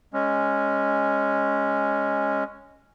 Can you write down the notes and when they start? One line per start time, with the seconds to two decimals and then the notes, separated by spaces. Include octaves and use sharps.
0.13 G#3 C#4